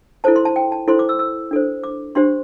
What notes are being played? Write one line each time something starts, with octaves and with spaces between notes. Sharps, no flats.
E4 A4 C5 A5
C6
A5
G5
A5
E4 A4 C5 C6
D6
E6
E6
D4 A4 C5
D6
D4 G4 C5 C6